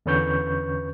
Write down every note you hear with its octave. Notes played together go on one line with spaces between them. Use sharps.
E2 D3 C#4 B4 C#6 G6